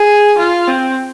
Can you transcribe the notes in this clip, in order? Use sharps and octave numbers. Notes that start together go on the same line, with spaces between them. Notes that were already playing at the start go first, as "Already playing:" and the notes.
Already playing: G#4
F4
C4